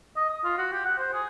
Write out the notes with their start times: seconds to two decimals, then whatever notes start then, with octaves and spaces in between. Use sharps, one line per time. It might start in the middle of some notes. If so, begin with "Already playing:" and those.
0.16 D#5
0.29 D#6
0.44 F4
0.58 F#4
0.72 G4
0.85 F#5
0.98 C5
1.13 G#4